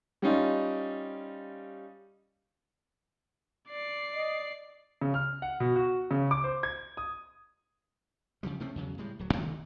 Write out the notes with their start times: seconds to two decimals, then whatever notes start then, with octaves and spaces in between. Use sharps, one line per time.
0.22 G3 C#4 D#4 F4
3.68 D5 C7
4.15 D#5
5.01 C#3
5.14 F6
5.42 F#5
5.60 B2
5.76 F#4
6.11 C#3
6.31 D6
6.44 C5
6.63 G#6
6.97 D#6
8.43 C#3 F3 G3
8.60 C3 A3 C4 C#4
8.76 E2 C#3 F#3
8.98 A2 G3 G#3
9.19 D1 F#3
9.33 D#2 D#3 G3 A3